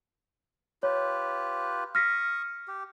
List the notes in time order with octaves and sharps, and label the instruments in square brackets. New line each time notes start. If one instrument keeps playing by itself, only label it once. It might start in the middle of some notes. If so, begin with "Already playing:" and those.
[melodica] F4 G4 B4 [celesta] C#5
[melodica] C#6 D#6 [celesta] F6 A#6 B6
[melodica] G4